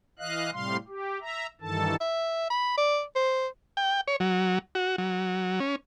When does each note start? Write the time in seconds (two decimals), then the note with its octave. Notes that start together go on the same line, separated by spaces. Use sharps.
0.19 E3 D#5 F5 F#6
0.53 A2 C3 G3 F5 C6
0.88 G4
1.21 E5 A#5
1.61 G2 D#3 E3 A4 A5
2.01 E5
2.50 B5
2.77 D5
3.16 C5
3.77 G5
4.08 C#5
4.20 F#3
4.75 F#4
4.98 F#3
5.60 C#4